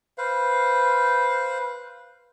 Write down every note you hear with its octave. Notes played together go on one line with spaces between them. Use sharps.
B4 C5 F5